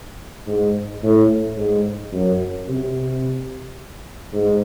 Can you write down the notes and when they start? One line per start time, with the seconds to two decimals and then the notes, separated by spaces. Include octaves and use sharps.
0.47 G#2
1.03 A2
1.57 G#2
2.13 F#2
2.68 C3
4.33 G#2